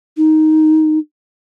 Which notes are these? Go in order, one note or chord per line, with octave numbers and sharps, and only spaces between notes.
D#4